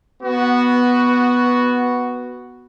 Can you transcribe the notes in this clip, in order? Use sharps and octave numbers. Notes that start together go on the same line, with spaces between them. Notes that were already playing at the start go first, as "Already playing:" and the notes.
B3 F#4